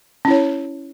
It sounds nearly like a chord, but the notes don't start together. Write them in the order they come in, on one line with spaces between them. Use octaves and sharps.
C#4 E4 C#5